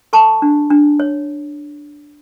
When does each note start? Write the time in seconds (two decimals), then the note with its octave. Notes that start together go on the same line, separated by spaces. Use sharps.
0.13 A4 A5 C#6
0.42 D4
0.70 D4
1.00 C#5